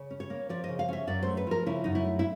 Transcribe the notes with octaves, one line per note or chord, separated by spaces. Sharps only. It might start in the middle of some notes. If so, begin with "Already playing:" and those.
Already playing: C#3
C#4
C#5
A#3
F3 D5
C#3 D#5
F5
C#4 E5
F#2 D5
A3 C5
B4
F3 A#4
C#3 E4
F#2 D#4
E4
A3
E4